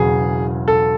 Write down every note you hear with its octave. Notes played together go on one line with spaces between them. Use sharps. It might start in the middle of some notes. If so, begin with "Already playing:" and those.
Already playing: E1 E2 C#3 F#3 G#4
A4